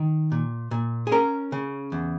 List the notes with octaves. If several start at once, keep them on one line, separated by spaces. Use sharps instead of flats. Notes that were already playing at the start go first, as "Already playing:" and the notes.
Already playing: D#3
A#2
A#2
G#4
C#4 A#4
C#3
E2